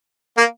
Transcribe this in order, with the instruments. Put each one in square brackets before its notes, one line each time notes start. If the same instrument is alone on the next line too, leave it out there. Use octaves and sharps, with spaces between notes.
[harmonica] A#3